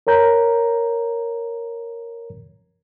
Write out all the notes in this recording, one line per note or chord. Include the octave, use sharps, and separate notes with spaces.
A#4 C#5 A#5 G6